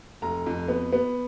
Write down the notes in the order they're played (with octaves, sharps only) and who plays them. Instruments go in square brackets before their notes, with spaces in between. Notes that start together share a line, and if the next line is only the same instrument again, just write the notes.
[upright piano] F1 A#5
F2
B3
B3